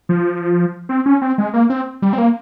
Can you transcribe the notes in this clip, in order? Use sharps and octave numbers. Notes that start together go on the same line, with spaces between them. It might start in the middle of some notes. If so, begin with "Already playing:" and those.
F3
C4
C#4
C4
G#3
A#3
C4
G3
C4
A#3